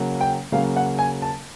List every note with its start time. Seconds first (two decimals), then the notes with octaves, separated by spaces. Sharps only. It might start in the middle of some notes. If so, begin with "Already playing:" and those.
Already playing: C#3 F#3 A#3
0.21 G5
0.52 C#3 F#3 A#3 F5
0.76 F#5
0.99 G#5
1.22 A5